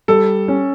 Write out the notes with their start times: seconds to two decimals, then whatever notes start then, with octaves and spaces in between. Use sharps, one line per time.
0.08 G3 A4
0.48 C#4